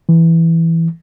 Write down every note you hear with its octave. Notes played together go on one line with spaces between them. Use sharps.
E3